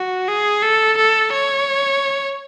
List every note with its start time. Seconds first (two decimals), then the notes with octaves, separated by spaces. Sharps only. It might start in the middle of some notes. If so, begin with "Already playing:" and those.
Already playing: F#4
0.28 G#4
0.62 A4
0.97 A4
1.32 C#5